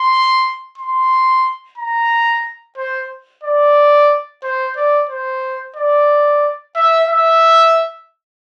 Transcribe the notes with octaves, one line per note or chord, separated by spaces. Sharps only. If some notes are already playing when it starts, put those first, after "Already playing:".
Already playing: C6
C6
A#5
C5
D5
C5
D5
C5
D5
E5
E5